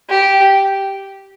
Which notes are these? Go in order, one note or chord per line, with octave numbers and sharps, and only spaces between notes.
G4